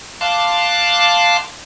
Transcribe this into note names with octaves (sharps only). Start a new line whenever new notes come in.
F5 A5 C6 D6 F#6